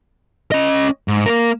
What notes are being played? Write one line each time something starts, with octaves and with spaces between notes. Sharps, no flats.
C#4 D#5
G#2
A#3 A#4